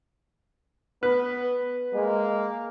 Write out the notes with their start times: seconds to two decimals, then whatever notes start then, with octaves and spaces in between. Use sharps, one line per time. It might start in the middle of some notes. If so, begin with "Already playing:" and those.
1.03 B3 B4
1.94 G#3 A#3